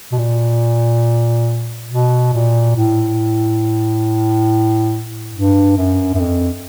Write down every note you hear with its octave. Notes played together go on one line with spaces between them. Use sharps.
B2
A#2
B2
A#2
A2
G2
F#2
F#2
F2